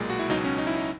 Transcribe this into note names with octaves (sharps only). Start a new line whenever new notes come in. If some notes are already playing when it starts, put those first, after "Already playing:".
Already playing: B1 A#2 G#3
F#4
E4
C#2 B2 F#3 D#4
C#4
D#4
E4
D#4